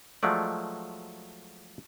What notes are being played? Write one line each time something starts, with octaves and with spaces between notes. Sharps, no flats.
F3 F#3 G#3 A3 D5